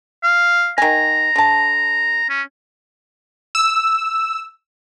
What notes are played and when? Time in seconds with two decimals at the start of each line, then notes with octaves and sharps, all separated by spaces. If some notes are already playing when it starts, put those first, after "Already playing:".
0.23 F5
0.78 D#3 G#5 A#5
1.36 D3 A5
2.29 C#4
3.55 E6